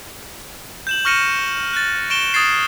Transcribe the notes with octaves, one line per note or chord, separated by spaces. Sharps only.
G6 E7 F#7
C#6 F6 A#6 C#7 D#7 E7
F#6 A6
C#6 D7 E7 G7
D#6 G#6 A6 C7